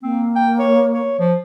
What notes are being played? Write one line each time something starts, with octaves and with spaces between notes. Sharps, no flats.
A#3 C4
G5
C#5
C#5
F3